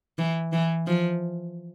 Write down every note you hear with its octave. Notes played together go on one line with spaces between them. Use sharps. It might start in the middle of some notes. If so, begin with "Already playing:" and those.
E3
E3
F3